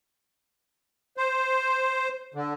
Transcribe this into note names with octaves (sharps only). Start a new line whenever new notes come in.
C5
D3